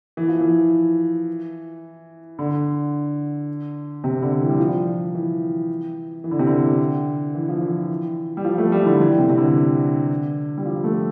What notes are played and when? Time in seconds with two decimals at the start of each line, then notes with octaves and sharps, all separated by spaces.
0.17 E3
0.28 F3
0.41 E3
2.39 D3
4.04 C3
4.22 D3
4.41 E3
4.49 G3
4.59 F3
5.15 E3
6.24 E3
6.31 D3
6.39 C3
6.47 D3
7.35 E3
7.49 F3
7.62 E3
8.37 G3
8.45 F3
8.58 A3
8.72 G3
8.82 E3
8.87 D3
9.00 E3
9.19 C3
9.29 C3
9.38 D3
10.57 G3
10.65 F3
10.84 A3